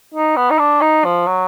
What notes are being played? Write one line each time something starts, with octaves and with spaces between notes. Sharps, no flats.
D#4
B3
D#4
D4
D#4
F3
F#3